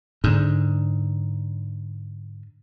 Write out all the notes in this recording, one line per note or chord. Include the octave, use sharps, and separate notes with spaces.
G#2 D3